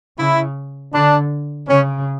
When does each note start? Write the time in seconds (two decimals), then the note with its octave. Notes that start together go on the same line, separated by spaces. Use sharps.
0.18 C#3 E4
0.93 D3 D4
1.68 C#3 C#4